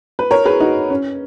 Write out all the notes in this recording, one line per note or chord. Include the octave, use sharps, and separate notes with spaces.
B4
A#4 C#5
G#4 B4
D#4 F#4
C#4